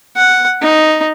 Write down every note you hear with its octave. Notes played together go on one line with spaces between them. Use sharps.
F#5
D#4